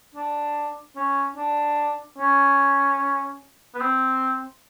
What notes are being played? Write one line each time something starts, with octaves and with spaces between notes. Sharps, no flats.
D4
C#4
D4
C#4
B3
C4